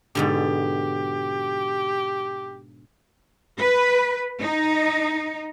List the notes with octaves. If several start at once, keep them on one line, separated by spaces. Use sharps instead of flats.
G#2 B2 D3 G4
B4
D#4